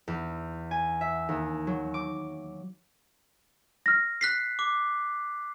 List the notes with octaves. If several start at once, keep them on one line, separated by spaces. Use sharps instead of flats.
E2
G#5
E5
D#2
F#3
D6
F6 A#6
F#6 B6 C7
D6